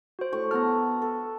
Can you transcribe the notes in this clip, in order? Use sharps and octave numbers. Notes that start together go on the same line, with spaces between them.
F#4 C5
A2 C#6
B3 A4 F#5 A#5 F6
A4